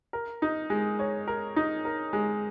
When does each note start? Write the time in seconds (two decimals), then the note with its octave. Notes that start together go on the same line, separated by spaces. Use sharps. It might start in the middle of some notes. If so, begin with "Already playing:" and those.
0.13 A#4
0.42 D#4
0.70 G#3
0.99 C#5
1.28 A#4
1.56 D#4
1.85 A#4
2.13 G#3